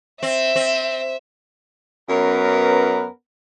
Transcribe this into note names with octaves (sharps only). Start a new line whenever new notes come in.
C4 E5
C4
F#2 B3 C#4 A#4 B4 A#5